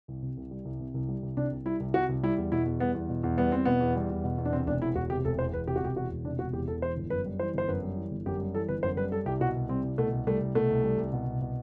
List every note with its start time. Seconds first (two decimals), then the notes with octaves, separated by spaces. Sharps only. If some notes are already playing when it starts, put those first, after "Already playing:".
0.08 C2
0.22 C3
0.37 C2
0.51 G3
0.65 C2
0.80 C3
0.94 C2
1.09 G3
1.23 C2
1.37 C3 D4
1.52 C2
1.65 G3 E4
1.80 C2
1.94 C3 F#4
2.09 C2
2.23 G3 E4
2.37 E2
2.52 B2 E4
2.66 E2
2.80 G3 B3
2.95 E2
3.09 B2
3.24 E2
3.38 G3 B3
3.52 E2 C4
3.65 B2 B3
3.81 E2
3.95 G3
4.10 E2
4.24 B2
4.38 E2
4.45 D4
4.53 C3 C4
4.67 E1 D4
4.82 E2 E4
4.95 E1 F#4
5.10 C3 G4
5.25 E1 A4
5.39 E2 C5
5.53 E1 B4
5.67 C3 G4
5.76 F#4
5.82 E1 G4
5.96 E2 F#4
6.11 E1
6.24 C3 D4
6.39 E1 F#4
6.53 E2 G4
6.68 E1 A4
6.82 E3 C5
6.96 G1
7.10 F#2 B4
7.26 G3
7.39 E3 C5
7.54 G1 C5
7.68 F#2 B4
7.83 G3
7.96 E3
8.11 G1
8.26 F#2 G4
8.39 G3
8.54 E3 A4
8.68 G1 B4
8.83 F#2 C5
8.97 G3 B4
9.12 G3 A4
9.26 C2 G4
9.40 B2 F#4
9.55 C2
9.69 G3 C4
9.83 C2
9.98 B2 A3
10.13 C2
10.27 G3 A3
10.41 C2
10.55 B2 A3
10.70 C2
10.84 G3
10.98 C2
11.13 B2
11.27 C2
11.42 B2